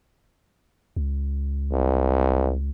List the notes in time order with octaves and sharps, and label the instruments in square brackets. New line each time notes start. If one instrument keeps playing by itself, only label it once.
[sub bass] C#2
[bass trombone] C2